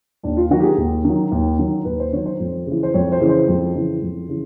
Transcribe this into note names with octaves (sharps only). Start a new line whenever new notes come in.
D#2 D4
F4
D#3 F#3 F#4
G4
G#4
D#2
D#3 F#3
D#2
D#3 F#3
D#2 B4
C5
D#3 F#3 C#5
C5
F2
C#3 E3
C5
F2 C#5
C5
C#3 E3
C5
F2
C#3 E3
F2
C#3 E3